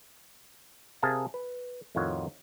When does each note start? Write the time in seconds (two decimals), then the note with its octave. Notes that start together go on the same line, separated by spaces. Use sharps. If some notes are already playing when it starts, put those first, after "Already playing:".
1.02 C3 G#4 A#4 F5 A5
1.34 B4
1.95 F2 A2 D#3 F4 F#4 C#5